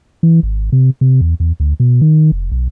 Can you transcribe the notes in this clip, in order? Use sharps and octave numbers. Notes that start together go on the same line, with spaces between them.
E3
G#1
C3
C3
E2
E2
D2
B2
D#3
F1
B1